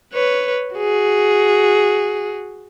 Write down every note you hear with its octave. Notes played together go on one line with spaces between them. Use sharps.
B4 C#5
F#4 G#4